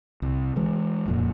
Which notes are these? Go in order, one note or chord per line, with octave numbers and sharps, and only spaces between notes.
C2
E3 G#3
D#1 F2 A#2